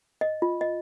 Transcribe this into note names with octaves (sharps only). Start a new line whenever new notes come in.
D#5
F4
D#5